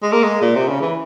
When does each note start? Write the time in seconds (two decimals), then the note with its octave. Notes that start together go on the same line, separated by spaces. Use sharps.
0.03 G#3
0.13 A#3
0.23 G#3
0.42 A#2
0.55 C3
0.68 C#3
0.81 E3